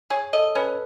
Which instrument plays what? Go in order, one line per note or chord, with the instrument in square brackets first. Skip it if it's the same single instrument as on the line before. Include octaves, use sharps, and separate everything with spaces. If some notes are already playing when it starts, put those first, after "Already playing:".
[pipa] G#4 [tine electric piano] C#5
[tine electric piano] A4 [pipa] D#5
[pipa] C#4 [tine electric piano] B4